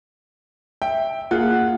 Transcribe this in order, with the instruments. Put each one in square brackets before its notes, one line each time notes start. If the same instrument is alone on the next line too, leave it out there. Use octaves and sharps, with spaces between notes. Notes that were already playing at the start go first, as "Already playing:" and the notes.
[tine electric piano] E5 [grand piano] G5
[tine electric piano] A#3 F#5 F#6 [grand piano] F4 G#4